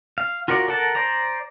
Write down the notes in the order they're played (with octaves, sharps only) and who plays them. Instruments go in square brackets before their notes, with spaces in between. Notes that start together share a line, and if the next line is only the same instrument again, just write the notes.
[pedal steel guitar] F5
F4 F#4 A#4 C#5 D5
A4 A#4 F#5 A5
C5 D5 A#5